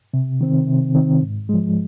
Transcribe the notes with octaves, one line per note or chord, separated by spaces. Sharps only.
C3
D#3 C4
C3
D#3 C4
G#2
F3 G#3